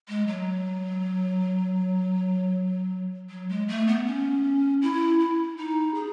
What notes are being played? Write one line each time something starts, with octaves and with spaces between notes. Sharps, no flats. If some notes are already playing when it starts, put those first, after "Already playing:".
G#3
F#3
F#3
G#3
A3
B3
C#4
E4
E4
D#4
G#4